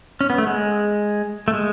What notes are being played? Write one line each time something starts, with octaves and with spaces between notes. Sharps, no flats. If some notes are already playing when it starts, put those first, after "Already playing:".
C#4
B3
A3
G#3
A3
G#3